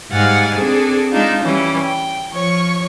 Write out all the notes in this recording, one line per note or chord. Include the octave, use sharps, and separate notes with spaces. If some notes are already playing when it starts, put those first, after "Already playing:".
G#2 G3 F5 F#5 G#5 A6
C4 D4 G#4 A4
G#3 D4 D#4 F4
E3 G3 C#4
G5
F3 C#5 C#6